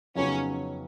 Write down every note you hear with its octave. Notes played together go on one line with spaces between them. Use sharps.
F2 C#3 F#3 B3 C#4 D#4